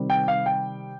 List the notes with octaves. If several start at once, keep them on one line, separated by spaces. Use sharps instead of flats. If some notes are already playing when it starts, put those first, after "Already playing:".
Already playing: C3 D#3 G3 C4
G5
F5
G5